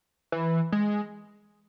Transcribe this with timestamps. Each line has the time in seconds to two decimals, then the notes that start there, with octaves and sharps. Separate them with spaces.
0.32 E3
0.72 G#3